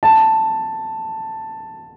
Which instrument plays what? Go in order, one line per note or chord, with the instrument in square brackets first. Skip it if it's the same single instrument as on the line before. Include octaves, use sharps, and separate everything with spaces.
[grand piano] A5